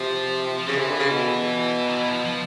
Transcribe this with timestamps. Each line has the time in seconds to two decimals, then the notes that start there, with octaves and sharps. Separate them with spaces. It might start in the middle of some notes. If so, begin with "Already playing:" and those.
Already playing: C3 F3
0.58 F3
0.67 C#3 E3
0.79 C3
0.89 D3
0.99 C#3
1.10 B2
1.89 D#3
1.97 E3
2.11 F3
2.25 F3